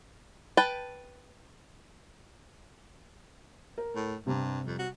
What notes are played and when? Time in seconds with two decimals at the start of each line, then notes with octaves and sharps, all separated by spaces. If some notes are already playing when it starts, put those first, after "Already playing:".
0.57 B4 G5 A5
3.78 A#4
3.95 A2
4.27 G2 C3 G3
4.66 F2
4.79 F#4